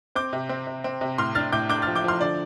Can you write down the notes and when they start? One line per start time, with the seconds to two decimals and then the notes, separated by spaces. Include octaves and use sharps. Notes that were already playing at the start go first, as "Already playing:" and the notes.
0.15 C4 D6 G6
0.33 C3
0.49 C4
0.67 C3
0.84 C4
1.01 C3
1.18 A2 C6 F6
1.35 D4 F6 A6
1.52 A2 D6 G6
1.69 D4 D6 G6
1.82 F3 F6 A6
1.95 D6 G6
2.04 F3 C6 F6
2.21 D3 D5